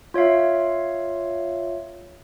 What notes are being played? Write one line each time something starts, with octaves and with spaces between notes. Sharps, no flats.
F4 C#5 E5 F5